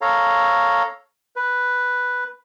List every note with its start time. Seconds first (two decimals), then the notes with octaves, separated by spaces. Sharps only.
0.01 A4 C#5 F5 A#5
1.36 B4